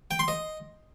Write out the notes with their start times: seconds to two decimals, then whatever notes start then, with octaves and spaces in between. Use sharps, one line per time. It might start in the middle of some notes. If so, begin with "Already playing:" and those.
0.11 G5
0.19 C6
0.28 D#5